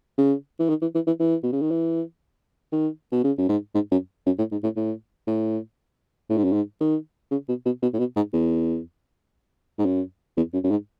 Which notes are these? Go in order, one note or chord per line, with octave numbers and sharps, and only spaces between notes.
C#3
E3
D#3
E3
E3
E3
E3
B2
C#3
D#3
E3
D#3
B2
C#3
F#2
G#2
G#2
F#2
F#2
A2
G#2
A2
A2
A2
A2
G#2
F#2
G#2
D#3
C#3
B2
B2
B2
A2
B2
G#2
E2
G#2
F#2
E2
F#2
F#2
G#2